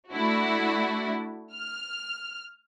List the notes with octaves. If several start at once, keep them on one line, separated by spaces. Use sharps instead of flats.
A3 D4 E4 F#4
F6